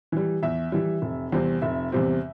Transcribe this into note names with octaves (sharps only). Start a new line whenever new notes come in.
E3 G3
E2 E5
E3 G3
F1
E2 C3 G3 C4
F1 E5
E2 C3 G3 C4